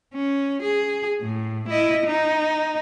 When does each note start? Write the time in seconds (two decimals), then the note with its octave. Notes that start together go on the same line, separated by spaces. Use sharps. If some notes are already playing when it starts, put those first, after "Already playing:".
0.14 C#4
0.62 G#4
1.22 A2
1.68 E4 D#5
2.06 D#4